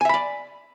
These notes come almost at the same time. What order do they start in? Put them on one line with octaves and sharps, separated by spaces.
G#5 E5 B5 D5